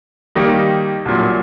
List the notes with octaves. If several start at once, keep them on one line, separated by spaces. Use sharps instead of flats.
D#3 G3 A#3 D#4 G4
C2 A#2 F#3